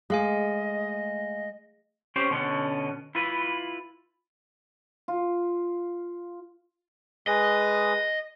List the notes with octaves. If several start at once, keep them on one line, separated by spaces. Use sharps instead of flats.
G#3 A3 D#5 F5 G#5
C#4 G4 C5
B2 D3 B3 C#4
E4 F4 B4
F4
G#3 G#4 B4 D#5